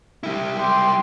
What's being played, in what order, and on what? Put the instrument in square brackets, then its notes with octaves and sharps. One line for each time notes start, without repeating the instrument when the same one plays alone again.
[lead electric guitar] G3 E4
[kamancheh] G4 C6